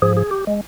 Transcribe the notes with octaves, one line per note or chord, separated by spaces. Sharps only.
G#2 F3 G#4
G#4
G4
G#3